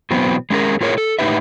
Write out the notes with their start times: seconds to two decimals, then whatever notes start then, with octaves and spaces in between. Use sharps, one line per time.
0.11 B2 E3 F#3 B3 C4
0.50 G#3 C#4 G#4 A#4
0.81 A2 F4 G#4 A#4 C#5
0.98 A4
1.19 A2 D#4 E4 G4 B4 E5